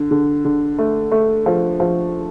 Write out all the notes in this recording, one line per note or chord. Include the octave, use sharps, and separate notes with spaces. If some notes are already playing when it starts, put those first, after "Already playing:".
Already playing: D3
D3
D3
A3
A3
F3
F3